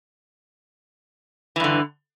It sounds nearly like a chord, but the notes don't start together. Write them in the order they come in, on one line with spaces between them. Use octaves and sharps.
E3 G2 D3